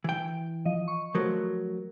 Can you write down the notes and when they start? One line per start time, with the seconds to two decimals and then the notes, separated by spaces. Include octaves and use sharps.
0.04 E3 G5
0.65 F3 D#5
0.88 C#6
1.15 F3 F#3 A3 A#4